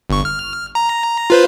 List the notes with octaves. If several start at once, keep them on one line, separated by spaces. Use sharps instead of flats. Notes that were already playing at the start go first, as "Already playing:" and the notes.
G1 C#6
F6
A#5
F4 B4 C5